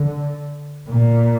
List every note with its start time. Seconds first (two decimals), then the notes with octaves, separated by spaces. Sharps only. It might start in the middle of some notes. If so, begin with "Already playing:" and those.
Already playing: D3
0.89 A#2